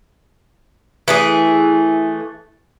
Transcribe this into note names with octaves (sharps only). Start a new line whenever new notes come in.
E3 A3 G#4